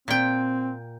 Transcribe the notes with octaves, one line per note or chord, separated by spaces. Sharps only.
A#2 C4 G5